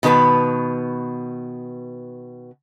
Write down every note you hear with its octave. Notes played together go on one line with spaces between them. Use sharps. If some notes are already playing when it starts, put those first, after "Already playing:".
B2 D#3 B3 B4 A5